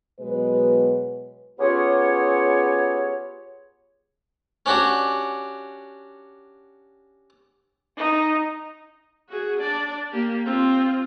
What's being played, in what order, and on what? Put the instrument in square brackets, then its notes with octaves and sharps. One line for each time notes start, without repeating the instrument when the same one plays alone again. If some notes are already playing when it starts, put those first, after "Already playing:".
[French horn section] B2 F#3 G#3 B4
[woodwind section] B3 C#4 F4 G4 G#4 C#5
[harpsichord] C#4 D4 F#4 G4
[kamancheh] D#4
[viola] F#4 G#4
D4 D5
A#3 G4
C4 F4